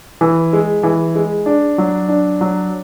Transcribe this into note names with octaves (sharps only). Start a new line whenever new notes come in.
E3
G#3
E3
G#3
D4
F#3
D4
F#3